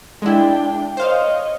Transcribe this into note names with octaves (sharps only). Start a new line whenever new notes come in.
G#3 D4 E4 G5
C5 C#5 D#5 F5